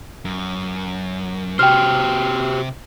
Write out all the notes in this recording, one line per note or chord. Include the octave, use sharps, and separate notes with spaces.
F#2
C3 C4 F#4 G4 C5 G5 F6